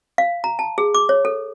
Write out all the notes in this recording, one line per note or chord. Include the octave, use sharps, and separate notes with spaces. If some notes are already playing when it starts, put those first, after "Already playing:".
F5
A#5
A5
G#4
D6
C#5
A4